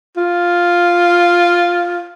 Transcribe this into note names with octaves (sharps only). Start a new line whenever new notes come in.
F4